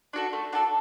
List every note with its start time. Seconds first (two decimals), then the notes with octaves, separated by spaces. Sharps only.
0.13 D4 F#4 A4
0.33 A3
0.53 D4 F#4 A4